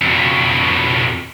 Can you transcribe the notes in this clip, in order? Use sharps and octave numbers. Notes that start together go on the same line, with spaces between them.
F2 B2